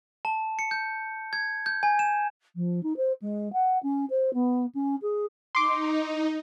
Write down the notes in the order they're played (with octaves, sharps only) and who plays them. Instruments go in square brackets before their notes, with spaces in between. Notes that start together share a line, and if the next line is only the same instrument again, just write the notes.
[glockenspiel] A5
C#7
G6
G#6
G6
G#5
E7
[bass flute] F3
D#4
C5
G#3
F#5
C#4
C5
B3
C#4
G#4
[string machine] D#4 [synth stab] C6 D6